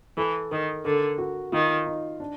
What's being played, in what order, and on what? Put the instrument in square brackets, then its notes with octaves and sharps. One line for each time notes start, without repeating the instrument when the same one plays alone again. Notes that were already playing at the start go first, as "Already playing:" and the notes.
[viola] E3 [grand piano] A4
[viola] D#3 [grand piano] A#4
[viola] D3 [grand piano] A#4
[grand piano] F#4
[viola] D#3 [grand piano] F4
[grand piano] D#4
D4